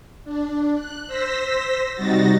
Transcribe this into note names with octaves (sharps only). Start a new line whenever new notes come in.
D4
F#6
C5 E6 A#6 B6
C3 G3 D#4 F#4 A6 A#6